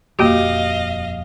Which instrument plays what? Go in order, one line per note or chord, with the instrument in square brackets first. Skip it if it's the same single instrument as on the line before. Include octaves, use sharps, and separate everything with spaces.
[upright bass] D#1 F2 [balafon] A#3 F#4 G4 [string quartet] D#5 F5